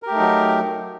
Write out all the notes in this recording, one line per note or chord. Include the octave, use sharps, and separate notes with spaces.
F#3 A3 D#4 G4 A#4